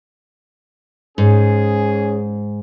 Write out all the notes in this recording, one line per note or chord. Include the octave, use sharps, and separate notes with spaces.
G#2 C#4 G#4